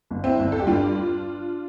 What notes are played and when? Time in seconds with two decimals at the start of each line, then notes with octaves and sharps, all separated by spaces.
0.11 G1
0.24 C4 E4
0.39 G1
0.52 A4
0.60 G4
0.67 G2 D4 F4